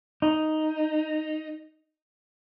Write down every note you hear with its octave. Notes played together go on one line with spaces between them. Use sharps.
D#4